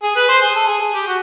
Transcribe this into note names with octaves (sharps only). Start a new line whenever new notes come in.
G#4
B4
C5
G#4
A4
G#4
G#4
G4
F#4